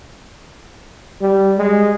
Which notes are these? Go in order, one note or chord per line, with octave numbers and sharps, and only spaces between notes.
G3
G#3